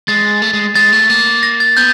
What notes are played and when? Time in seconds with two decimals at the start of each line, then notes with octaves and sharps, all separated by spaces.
0.08 G#3 A6
0.42 A3
0.53 G#3
0.76 G#3 A6
0.92 A3
1.10 A#3
1.43 A#6
1.60 A6
1.77 B3 G6